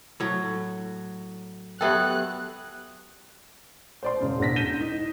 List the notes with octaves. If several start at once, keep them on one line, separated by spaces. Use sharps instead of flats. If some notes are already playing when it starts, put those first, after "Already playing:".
A2 F#3
F#3 B3 G4 A4 E5 G5 F#6
C5 D5 C6
E1 C#3
E1 B2 D4 A#6 B6
G6 A#6 B6 D#7 E7 G7
D#4